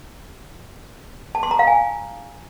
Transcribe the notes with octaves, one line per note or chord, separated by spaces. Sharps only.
A5
C6
A#5
F5
G#5